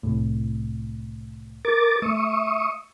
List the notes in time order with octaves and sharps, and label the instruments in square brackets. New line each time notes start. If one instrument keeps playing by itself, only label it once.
[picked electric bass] C2 A2
[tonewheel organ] A#4 D6 A6
[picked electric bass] A3 [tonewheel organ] E5 C#6 D#6